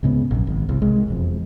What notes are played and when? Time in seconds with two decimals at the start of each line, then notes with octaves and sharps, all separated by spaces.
0.03 C#2 G#2 C#3 B3
0.31 A#1 F#2
0.47 G#1
0.69 C2
0.82 C2 G#3
1.08 E1 F2